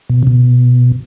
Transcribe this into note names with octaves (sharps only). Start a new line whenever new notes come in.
B2
C#3
B2